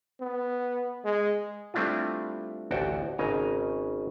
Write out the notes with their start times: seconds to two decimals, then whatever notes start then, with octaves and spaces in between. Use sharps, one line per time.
0.20 B3
1.05 G#3
1.74 G3 A3 C4 D4 E4 F4
2.71 A1 D2 F#4 G5 A5
3.18 G#1 C#3 D#5 G#5 A#5